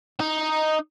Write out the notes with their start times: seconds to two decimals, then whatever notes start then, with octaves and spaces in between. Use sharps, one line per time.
0.20 D#4